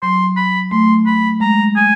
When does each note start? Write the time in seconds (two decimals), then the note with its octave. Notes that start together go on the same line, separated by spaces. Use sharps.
0.02 F#3 C6
0.36 B5
0.71 A3 C6
1.06 B5
1.40 G#3 A#5
1.76 G#5